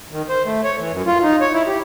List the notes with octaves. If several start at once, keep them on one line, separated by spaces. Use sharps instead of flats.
D#3
C5
A3
C#5
E3
F#2
F4
D#4
C#5
E4
G4